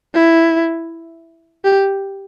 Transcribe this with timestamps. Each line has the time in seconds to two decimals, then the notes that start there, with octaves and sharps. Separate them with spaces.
0.14 E4
1.64 G4